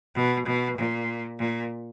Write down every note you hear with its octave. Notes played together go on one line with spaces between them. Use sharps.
B2
B2
A#2
A#2